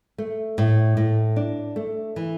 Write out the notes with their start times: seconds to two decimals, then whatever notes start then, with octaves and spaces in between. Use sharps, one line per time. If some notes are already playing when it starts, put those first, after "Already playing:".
0.18 A3
0.58 A2
0.97 A2
1.36 D4
1.76 A3
2.16 E3